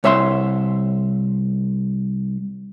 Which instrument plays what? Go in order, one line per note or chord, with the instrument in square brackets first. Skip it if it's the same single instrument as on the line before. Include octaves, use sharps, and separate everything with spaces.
[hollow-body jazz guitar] C2 C#5 E5 F5 C6